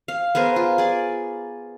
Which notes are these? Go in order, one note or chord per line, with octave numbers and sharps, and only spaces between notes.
F5
B3 G#4 A#4 C5
F4
G#4 D5